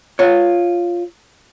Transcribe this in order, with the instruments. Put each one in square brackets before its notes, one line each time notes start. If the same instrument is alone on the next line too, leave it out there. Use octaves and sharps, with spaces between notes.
[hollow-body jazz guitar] F4 C#5